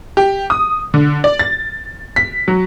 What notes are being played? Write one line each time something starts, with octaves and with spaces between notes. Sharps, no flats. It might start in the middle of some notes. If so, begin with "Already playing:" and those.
G4
D#6
D3
D5
A6
B6
F#3